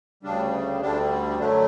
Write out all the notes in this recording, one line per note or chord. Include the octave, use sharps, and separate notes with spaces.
D2 C#3 G3 D4
D2 D3 G3 D4
F#2 D3 F#3 A3 D4